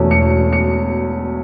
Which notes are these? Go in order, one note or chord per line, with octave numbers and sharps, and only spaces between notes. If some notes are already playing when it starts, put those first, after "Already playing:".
Already playing: E1 E2 B2 A3 C#4
C#7
C#7